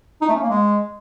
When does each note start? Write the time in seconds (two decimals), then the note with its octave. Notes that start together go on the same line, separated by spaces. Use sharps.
0.22 D#4
0.29 A3
0.36 C#4
0.43 A#3
0.50 G#3